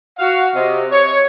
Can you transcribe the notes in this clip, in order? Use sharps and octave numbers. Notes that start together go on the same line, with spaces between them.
F#4 F5
C3 D#5
C#5